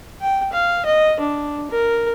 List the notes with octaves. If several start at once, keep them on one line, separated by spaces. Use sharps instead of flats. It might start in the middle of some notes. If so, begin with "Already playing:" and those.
G5
F5
D#5
D4
A#4